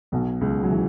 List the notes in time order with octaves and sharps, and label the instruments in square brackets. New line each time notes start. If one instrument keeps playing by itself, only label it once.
[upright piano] B1 B2
C#2 C#3
F#3
E3